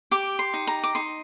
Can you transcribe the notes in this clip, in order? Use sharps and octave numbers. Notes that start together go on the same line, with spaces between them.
G4 D6
C6
D#4
A#5
D6
D#4 C6